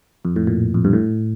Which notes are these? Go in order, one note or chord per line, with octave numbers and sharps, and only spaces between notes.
F2
A2
A#2
F2
G2
A2